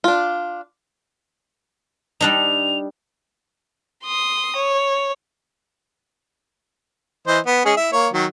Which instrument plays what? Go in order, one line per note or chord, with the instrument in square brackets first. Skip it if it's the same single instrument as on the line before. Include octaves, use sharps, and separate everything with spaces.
[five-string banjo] D4 F4
[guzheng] G3 D4 D#4 [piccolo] F7
[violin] C6 D#6
C#5
[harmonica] E3 C5 D#5
B3
G#3 C#4 G#4
E4 E5
A#3 C#5
D#3 F#3